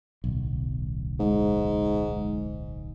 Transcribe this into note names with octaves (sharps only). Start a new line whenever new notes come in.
D1 B1
G#2